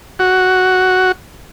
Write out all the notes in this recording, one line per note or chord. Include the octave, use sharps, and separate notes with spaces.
F#4